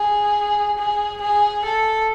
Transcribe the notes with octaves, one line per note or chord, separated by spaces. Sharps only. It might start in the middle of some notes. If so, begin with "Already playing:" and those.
Already playing: G#4
G#4
G#4
A4